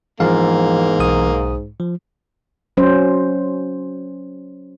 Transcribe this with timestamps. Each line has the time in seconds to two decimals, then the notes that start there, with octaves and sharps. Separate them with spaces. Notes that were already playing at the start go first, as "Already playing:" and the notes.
0.20 E2 G#2 F3 A#3 F5
0.99 B1 D#6
1.80 F3
2.77 F#3 C#4 C5